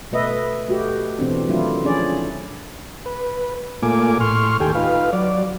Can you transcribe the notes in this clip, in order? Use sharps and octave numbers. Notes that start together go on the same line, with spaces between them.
B2 A3 B4 D#5 E5
A3 F#4 G4
B2 E3 C4 D4
D#3 F#3 A3 D4 E4 F4
F3 C#4 D4 G#4 D5
B4
A#2 A3 A#3 F4 G#5 D6
A2 C6 C#6 F6
D#2 G4 A4 G5 G#5
D#4 F4 B4 F5
F#3 D5